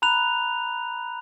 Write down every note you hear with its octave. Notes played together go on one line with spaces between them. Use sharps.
A#5 B5 F#6 F7